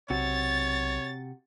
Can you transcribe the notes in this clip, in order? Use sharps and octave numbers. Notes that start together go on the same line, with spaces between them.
B1 C3 F#4 C#5 A6